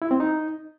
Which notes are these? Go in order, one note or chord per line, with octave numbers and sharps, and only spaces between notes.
E4
C4
D#4